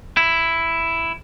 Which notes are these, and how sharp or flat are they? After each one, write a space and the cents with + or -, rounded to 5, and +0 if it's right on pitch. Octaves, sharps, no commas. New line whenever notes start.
E4 +5